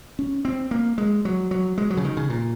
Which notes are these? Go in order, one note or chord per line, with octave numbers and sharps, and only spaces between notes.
C#4
C4
A#3
G#3
F#3
F#3
G#3
F#3
C#3
D#3
C#3
A#2